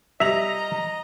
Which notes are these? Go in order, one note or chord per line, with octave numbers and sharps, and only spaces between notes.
G3 D#5 E5 A#5 A#6 F7